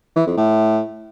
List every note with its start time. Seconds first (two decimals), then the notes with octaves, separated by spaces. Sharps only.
0.16 E3
0.27 F2
0.37 A2